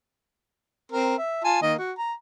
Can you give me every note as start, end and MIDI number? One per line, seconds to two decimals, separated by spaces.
0.92 1.15 60
0.92 1.15 70
1.18 1.40 76
1.44 1.62 65
1.44 1.62 80
1.44 1.62 81
1.62 1.74 51
1.62 1.74 58
1.62 1.74 75
1.78 1.92 66
1.98 2.13 82